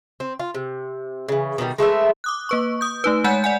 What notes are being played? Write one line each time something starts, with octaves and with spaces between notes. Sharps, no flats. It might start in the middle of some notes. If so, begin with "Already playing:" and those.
C4
F4
C3
C#3 E3
B2 D#3 F#3 G3
G#3 A3 B3 E5
D6 D#6 F#6
A#3 B4 C#6
D#6 G6
A3 D#4 B4
G#3 C#5 F#5 G#5 G6
D5 F#5 G#5